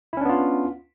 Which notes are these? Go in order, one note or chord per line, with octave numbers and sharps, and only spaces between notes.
B3 C#4 D4 E4 F4